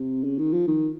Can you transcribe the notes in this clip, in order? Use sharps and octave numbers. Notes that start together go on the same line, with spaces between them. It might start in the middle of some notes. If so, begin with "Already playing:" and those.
Already playing: C3
C#3
D#3
F3
D#3